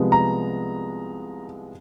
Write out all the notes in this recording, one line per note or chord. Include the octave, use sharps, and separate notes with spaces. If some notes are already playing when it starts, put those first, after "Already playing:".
Already playing: C2 C3 F3 G#3 B3
A#5